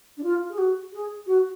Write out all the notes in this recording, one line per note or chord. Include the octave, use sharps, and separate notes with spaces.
D4
F4
G#4
F#4
G#4
F#4